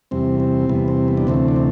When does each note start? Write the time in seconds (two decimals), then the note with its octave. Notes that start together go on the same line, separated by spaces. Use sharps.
0.11 E2 C3 G3 C4
0.40 C4
0.69 E2 C3 G3 B3
0.88 C4
1.08 B3
1.17 D4
1.27 D2 C3 E3 A3 C4
1.48 D4
1.56 C4